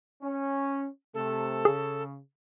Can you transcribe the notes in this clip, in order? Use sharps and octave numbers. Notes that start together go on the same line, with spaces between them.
C#4
C3 A3 A4
C#3 G#4